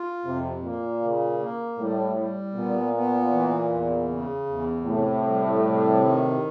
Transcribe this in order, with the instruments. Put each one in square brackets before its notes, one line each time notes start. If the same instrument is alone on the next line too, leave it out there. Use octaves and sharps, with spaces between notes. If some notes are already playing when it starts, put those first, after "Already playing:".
Already playing: [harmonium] F4
[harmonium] F2 [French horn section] C3
[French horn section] A#2 [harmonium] A#3
[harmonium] C#3
A#3
[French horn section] A2 [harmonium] G3
[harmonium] G3
[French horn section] A#2 [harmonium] B3
[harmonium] B3
E3
E2
C#3
E2
[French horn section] A2 [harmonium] C3
[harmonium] G3
C3
D#3